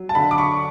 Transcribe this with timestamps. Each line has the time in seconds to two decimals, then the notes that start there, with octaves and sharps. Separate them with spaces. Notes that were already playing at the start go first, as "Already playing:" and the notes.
Already playing: F#3
0.09 A5
0.15 D3 B5
0.31 D6
0.38 C#6